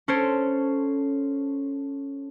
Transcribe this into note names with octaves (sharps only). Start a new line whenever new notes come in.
C#4 A4 C5 G#6 D7